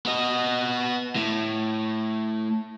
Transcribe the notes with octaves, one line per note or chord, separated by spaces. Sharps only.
B3 D#5
A2